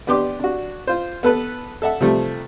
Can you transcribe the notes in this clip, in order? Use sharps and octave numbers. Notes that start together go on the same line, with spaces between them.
B3 D4 G4 C6 D6
D4 F#4
F4 C5
B3 A4 B4
A4 E5 F#5
C3 F3 G3 A3